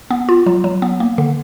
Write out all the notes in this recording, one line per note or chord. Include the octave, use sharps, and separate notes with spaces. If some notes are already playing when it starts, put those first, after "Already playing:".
B3
F4
F#3
F#3
B3
A#3
D3